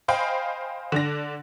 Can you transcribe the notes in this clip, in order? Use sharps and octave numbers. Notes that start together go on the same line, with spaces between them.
C5 D#5 F5 G5 G#5 B5
D3 D4 A#6